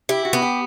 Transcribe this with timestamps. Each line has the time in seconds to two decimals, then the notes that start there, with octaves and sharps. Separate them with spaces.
0.09 E4 G4
0.25 F#4
0.33 B3
0.42 G4